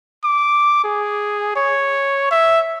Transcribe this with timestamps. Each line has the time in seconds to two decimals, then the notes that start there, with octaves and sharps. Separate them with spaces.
0.24 D6
0.84 G#4
1.56 C#5
2.32 E5